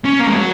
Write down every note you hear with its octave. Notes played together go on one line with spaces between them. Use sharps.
C#4
A#3
G#3
F#3